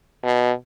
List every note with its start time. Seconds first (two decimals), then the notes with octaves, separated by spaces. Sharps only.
0.24 B2